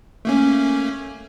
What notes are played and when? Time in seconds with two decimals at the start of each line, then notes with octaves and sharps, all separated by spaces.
0.25 A3 A#3 C#4